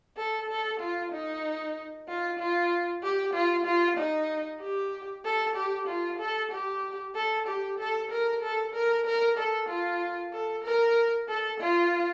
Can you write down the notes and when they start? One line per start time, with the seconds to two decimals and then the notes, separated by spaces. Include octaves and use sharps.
0.17 A4
0.49 A4
0.80 F4
1.12 D#4
2.08 F4
2.39 F4
3.03 G4
3.34 F4
3.66 F4
3.97 D#4
4.61 G4
5.25 A4
5.56 G4
5.88 F4
6.20 A4
6.52 G4
7.15 A4
7.48 G4
7.79 A4
8.11 A#4
8.43 A4
8.74 A#4
9.06 A#4
9.38 A4
9.69 F4
10.33 A4
10.64 A#4
11.28 A4
11.60 F4